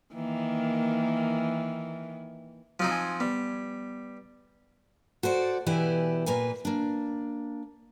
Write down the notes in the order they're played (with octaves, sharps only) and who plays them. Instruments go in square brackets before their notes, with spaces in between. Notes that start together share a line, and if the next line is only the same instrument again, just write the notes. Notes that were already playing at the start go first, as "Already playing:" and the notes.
[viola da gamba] D#3 E3 A#3
[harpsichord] F3 C4 D#4 [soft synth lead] F#3
[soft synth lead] G#5
[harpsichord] G3 [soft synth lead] B3
[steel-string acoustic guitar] F#4 A4 C5 D5
B2 E3 E4 G4 D5 G#5
A#2 A#3 B4 G#5
A#3 D4